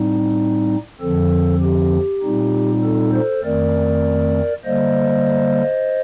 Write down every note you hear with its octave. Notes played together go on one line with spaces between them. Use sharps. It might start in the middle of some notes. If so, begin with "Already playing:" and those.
Already playing: A2 G3 C4 D#4
F2 D3 F3 C4 A4
G4
A#2 G3 C4 D#4
A4
A4 C5
F2 D#3 A3 C4 A#4 D5
D3 G3 A#3 C5 D#5